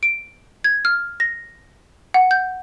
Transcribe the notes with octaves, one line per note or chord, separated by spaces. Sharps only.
D7
G#6
F6
A#6
F#5
G6